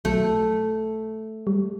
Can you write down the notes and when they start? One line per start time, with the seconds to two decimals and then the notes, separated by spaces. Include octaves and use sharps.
0.05 B1 B2 F#3 A3
1.47 G3